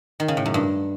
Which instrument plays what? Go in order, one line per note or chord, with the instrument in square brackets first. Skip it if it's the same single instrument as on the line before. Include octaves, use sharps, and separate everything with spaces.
[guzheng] D#3
C#3
A2
F#2
G2